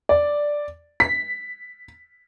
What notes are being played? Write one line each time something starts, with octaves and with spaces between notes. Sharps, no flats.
D5
B6